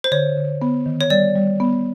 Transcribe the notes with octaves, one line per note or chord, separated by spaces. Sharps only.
C5
D3 C#5
D3
B3
D#3
C#5
G3 D5
G3
B3